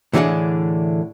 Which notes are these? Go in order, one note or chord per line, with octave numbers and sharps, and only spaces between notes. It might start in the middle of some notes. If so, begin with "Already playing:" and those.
A2 D3 E3 D4 G#4 F#5